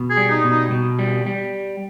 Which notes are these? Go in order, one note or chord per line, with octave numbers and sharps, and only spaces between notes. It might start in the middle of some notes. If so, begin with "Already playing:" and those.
Already playing: B2
G#4
G3
D#4
B2
D#4
B2
G3
G3